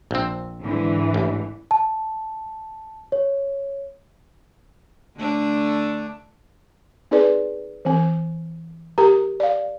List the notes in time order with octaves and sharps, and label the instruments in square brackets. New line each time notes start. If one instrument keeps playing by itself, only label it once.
[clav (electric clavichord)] A#1 C4
[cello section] G#2 D3 E3
[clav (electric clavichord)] A1
[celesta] A5
C#5
[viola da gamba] D3 A3 D4
[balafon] C4 D#4 G#4 B4 D5
E3 C4
G4 A#4 A#5
D5 F5